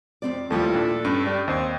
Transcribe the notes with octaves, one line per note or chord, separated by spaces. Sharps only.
F2 C4 D5
D#2 F3 G3 A3 E4 F4 A4
A#2 D4
G2 C#4
G3 D5
D#2 C4 D#5